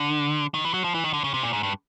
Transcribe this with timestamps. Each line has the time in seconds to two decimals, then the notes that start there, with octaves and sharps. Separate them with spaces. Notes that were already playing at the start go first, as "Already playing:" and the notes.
Already playing: D3
0.54 D#3
0.65 E3
0.74 F#3
0.84 F3
0.94 E3
1.04 D#3
1.13 D3
1.24 C#3
1.34 C3
1.43 A#2
1.53 G#2
1.63 G2